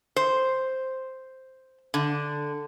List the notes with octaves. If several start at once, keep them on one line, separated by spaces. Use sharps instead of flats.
C5
D3